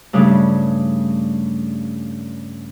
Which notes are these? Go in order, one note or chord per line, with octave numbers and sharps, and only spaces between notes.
G2 C#3 A3 D4